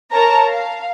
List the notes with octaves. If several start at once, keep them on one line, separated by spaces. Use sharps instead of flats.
A#4 C#5 A5 A#5
F5